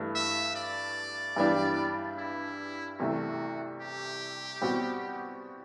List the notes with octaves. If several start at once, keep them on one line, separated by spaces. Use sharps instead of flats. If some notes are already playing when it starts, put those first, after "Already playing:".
Already playing: G2 E3 A3
E5
D5
G2 E3 G3 D4
E4
C2 C3 E3 A3 F#4
G4
B2 G3 C4 F#4